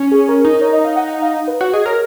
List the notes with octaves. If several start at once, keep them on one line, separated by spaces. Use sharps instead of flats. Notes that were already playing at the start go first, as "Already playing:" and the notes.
Already playing: C#4
G#4
A#4
D#4
C#5
D#5
F5
F#5
F5
B4
F#4 C#5
G#4 D#5
A#4 C#5